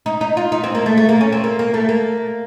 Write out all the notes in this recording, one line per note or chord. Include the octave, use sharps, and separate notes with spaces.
D#4
D#4
F4
D#4
C4
A#3
A3
A3
A#3
C#4
C4
A#3
A#3
A3
A#3